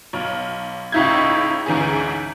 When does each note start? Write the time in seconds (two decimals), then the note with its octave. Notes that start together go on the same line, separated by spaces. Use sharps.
0.13 B1 F6
0.92 C#2 A2 D#4 E4 G6 G#6
1.66 D2 G#2 E3 C#4 G#4